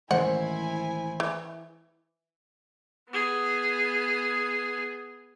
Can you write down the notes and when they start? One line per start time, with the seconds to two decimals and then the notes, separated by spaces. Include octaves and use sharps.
0.11 A1 D#3 G#3 E4 C5 F#5 G#5
1.20 E3
3.11 B3 G#4